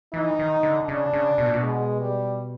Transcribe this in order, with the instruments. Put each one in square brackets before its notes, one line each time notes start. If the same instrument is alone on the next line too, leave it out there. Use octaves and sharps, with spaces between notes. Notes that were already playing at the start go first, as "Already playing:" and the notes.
[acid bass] E3 [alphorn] D#4
[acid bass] D#3
D3
[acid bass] C#3 [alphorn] D4
[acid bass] C#3
B2
A#2
B2
[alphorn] G#3
G3